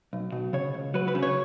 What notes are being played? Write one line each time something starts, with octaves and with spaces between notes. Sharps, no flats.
B1
B2
C#3 C#5
C#2
F#3 B4
B4
C#3
C#5